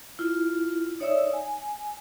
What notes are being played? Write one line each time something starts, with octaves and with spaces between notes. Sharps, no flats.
E4 F4
D#4 C#5 D5 E5 D#6 E6
G#5